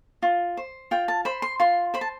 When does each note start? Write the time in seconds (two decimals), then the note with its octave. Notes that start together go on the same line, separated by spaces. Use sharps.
0.22 F4
0.57 C5
0.91 F4 G5
1.08 A5
1.25 C5 B5
1.42 C6
1.60 F4 C6
1.94 C5 B5
2.01 A5